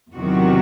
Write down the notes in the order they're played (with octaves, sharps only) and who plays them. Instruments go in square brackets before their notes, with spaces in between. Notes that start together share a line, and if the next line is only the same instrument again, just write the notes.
[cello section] E2 C3 D#3 F#3 F#4